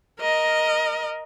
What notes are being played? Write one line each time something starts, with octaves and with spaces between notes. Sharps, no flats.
A#4 D#5